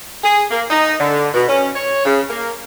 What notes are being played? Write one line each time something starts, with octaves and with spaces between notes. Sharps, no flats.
G#4
A#3
D#4
D3
B2
C#4
C#5
C#3
A#3